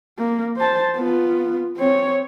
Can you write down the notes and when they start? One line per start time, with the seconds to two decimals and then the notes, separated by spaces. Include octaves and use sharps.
0.19 A#3
0.56 C5 A5
0.96 B3 F4
1.77 C4 C#5